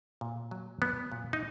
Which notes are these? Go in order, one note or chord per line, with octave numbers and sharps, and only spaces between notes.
A#2
F#3
F#3 B3
A#2
D#4